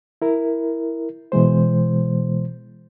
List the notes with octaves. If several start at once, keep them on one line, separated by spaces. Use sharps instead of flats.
E4 A#4
B2 E3 G#3 C5